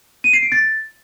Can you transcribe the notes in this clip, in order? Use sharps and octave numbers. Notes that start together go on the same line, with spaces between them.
D#7
C7
D7
A6